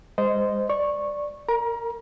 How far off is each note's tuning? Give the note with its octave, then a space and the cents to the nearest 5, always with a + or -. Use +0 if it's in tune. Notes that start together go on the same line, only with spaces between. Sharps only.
G#3 -35 C5 -15 D#5 +0
D5 +0 C#6 -15
A#4 -15 A#5 +30